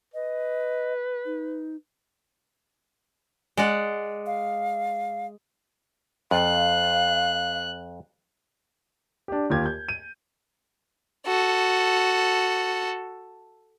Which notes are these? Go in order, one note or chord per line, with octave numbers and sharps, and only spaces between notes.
B4 D#5
D#4
G#3 D5 F#5
F5
F2 F5 F#6
D4 G4
D#2 F4 G4 G#6
G6
D#7
F#4 A4